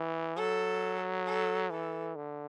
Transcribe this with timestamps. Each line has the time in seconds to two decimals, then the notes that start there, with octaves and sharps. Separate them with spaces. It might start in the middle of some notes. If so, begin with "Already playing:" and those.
Already playing: E3
0.36 F#3 A4
1.26 A4
1.70 E3 A4
2.15 D3